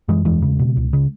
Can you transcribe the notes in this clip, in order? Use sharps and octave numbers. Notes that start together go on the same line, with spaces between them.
F#2 E3 G#3
E2 E3 G#3
C#3
B2
C#2
C#3